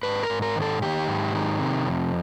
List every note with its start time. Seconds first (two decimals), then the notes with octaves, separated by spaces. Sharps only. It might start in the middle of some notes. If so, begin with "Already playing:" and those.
0.03 G#2 B4
0.23 A#4
0.30 G#2
0.42 A#4
0.56 D#3
0.62 A4
0.82 D#3 G4
1.08 G#2
1.34 D#3
1.60 C3
1.86 F2